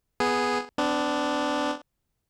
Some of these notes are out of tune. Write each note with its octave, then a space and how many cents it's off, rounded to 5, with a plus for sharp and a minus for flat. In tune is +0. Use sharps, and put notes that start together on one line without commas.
B3 +0 G#4 +0
B3 +45 D4 +0